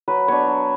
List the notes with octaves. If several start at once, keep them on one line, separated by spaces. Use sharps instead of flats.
F#3 B4
B3 D4 C#5
F#3